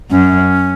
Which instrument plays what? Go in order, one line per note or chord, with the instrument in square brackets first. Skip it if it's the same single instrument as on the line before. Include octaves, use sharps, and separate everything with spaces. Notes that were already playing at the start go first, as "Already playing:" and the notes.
[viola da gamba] F#2 [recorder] C#4